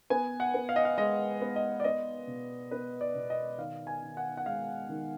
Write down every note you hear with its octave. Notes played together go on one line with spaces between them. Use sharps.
B3 G#5
F#5
B3
F5
D#5
F5
G#3 D#5
B3
D#5
D5
B3 D#5
B2
B3 B4
D5
B2
D#5
D#3 F5
G#5
D#3
F#5
F#5
G#3 F5
D#3